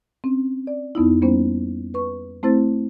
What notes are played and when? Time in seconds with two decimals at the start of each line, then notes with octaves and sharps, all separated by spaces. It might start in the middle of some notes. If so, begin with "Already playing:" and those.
0.24 C4 C#4
0.67 D5
0.95 F2 B3 D#4 E4
1.22 G3 A#3 B3 C#4 C5
1.94 B4 C#6
2.43 A3 C4 E4 C5 A6